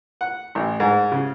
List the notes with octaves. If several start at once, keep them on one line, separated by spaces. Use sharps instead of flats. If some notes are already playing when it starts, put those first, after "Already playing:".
F#5
A1
G#2
C#3